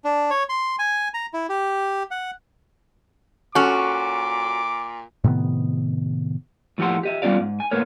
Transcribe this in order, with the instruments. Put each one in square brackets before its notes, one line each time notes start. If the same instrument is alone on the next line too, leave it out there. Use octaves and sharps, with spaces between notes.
[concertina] D4
C#5
C6
G#5
A#5
E4
G4
F#5
[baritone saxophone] A#2 [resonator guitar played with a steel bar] C#4 F#4 [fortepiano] A4 C#6 F6 [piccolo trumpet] D6
[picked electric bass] A2 C3 D#3 B3
[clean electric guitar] A2 F3 E4 G4 F#5 C6
G4 D#5 E5
G3 B3 C#4 F4 D5 F5
G#2
G#5
A2 A#3 B3 A#4 C#5